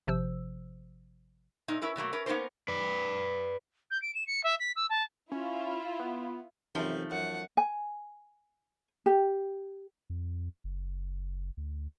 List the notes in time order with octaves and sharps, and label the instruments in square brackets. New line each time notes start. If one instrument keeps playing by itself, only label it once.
[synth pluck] G#1 C3 F3 C5 E6
[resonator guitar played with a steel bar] A#2 D#4
C#4 E4 A#4 B4
B2 F#3 A3 A#3
C#4 A#4 B4
A#3 B3 C#4 D#4 A#4 C5
[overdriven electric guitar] B4 D5
[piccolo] G6
D7
E7
C#7
E5
B6
E6
A5
[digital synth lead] C#4 [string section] E4 F4
[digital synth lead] B3
[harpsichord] F#2 C3 [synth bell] E3 D#4 A5 [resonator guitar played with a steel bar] F3 A3
[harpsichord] F#2 [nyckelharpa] F#5
[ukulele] G#5
G4
[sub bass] F2
F#1
D2